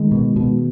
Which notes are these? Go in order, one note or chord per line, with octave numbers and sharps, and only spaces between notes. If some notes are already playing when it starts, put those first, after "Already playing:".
Already playing: D#3 G#3
B2
B2